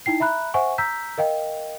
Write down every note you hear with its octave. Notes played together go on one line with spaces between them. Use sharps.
D#4 E4 G5 C7
E5 A#5 B5 F#6
C5 E5 F#5 G#5 C#6
A#5 E6 G6 B6
A#4 D#5 F5 G5